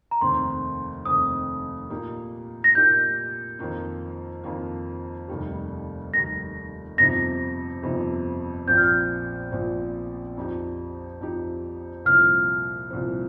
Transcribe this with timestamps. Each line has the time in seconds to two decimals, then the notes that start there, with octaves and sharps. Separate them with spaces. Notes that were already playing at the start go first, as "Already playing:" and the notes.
0.11 A#5
0.21 F1 D#2 D#3 C4 C6
1.05 F1 D#2 D#3 C4 D#6
1.90 A#2 A#3 D#4 G4
2.64 A#6
2.74 A#2 A#3 D#4 G4 G6
3.59 F2 D#3 A#3 F4
4.44 F2 D#3 A#3 F4
5.28 F1 D#2 D#3 G3
6.13 F1 D#2 D#3 G3 A#6
6.97 G1 F2 C3 F3 D#4 A#6
7.82 G1 F2 C3 F3 D#4
8.67 A#1 A#2 F3 C4 G6
8.77 F6
8.87 G6
9.52 A#1 A#2 F3 C4
10.37 F2 F3 D#4 G4
11.21 F2 F3 D#4 G4
12.05 C2 A#2 F3 F6
12.90 C2 A#2 F3